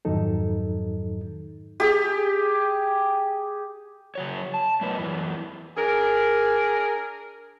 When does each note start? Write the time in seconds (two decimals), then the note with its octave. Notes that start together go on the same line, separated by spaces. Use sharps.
0.05 F2 G#2 D#3 F#3 D#4 A4
1.80 G4 G#4
4.15 C#3 F#3 C#5
4.54 A5
4.81 A2 F#3 A#3 D#4 B4 C#5
4.98 F#2 E3
5.77 D4 G#4 A#4